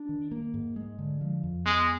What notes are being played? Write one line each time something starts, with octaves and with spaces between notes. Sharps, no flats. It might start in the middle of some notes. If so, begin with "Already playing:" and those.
Already playing: D4
D#3
A#3
G#2
G#3
D3
F3
F2
G#3 B3